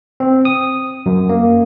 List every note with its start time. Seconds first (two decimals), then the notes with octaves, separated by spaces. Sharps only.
0.20 C4
0.45 D#6
1.06 F#2
1.29 A#3